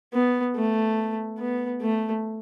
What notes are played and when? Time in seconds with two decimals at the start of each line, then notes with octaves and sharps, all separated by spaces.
0.14 B3
0.56 A3
1.40 B3
1.82 A3